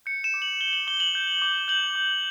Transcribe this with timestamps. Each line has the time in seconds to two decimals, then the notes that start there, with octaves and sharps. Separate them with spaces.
0.06 G6 C#7
0.24 E7
0.34 D6
0.42 F#7
0.60 G6 G7
0.73 F#7
0.87 D6 G7
1.00 F#7
1.15 G6
1.42 D6
1.68 G6 F#7
1.95 D6